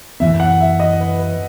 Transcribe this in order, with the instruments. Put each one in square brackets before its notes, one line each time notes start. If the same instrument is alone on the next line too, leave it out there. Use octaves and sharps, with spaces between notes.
[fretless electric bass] F#2 E3 B3 [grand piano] E5
[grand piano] F#5
E5
D#5
B4
B4